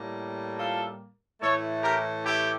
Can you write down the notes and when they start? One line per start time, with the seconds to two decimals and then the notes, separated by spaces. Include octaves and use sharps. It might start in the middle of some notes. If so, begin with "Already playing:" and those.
Already playing: A2 G3 A#3
0.57 F4 A4
1.40 A2 E3 A3 A4 C#5
1.82 G4 A#4
2.24 E4 G4